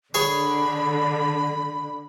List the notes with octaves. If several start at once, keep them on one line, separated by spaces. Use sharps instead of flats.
D3 G#4 C#5 G#5 B5